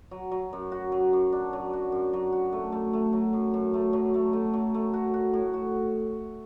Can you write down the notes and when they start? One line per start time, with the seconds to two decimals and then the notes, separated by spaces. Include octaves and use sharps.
0.11 F#3
0.31 F#3
0.53 F#2
0.72 F#4
0.92 F#3
1.13 F#2
1.33 D4
1.53 F#3
1.73 F#4
1.92 F#2
2.13 F#3
2.33 F#4
2.53 A3
2.72 A3
2.93 A3
3.13 F#3
3.33 F#2
3.54 F#2
3.74 A3
3.93 F#3
4.14 A3
4.33 A3
4.54 F#3
4.74 A3
4.94 F#4
5.14 F#4
5.33 A2
5.54 F#4